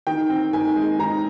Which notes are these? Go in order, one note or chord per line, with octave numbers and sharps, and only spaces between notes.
D#3 G5
C4
D#3 G#5
G#3
D#3 A#5